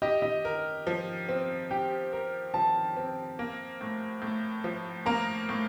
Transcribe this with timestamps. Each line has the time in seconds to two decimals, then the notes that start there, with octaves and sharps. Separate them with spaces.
0.02 G4 D#5
0.22 D#5
0.45 A#4
0.87 F3
1.29 C4
1.71 G4 G5
2.13 A#4
2.54 F3 A5
2.97 C4
3.39 A#3
3.81 A2
4.22 A2
4.64 F3
5.06 A#3 A#5
5.49 A2